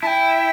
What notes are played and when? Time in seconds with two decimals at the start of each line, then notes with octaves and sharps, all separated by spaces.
0.03 E4 G5 A5